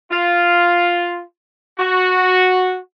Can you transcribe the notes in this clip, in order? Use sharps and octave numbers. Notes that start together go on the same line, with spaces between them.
F4
F#4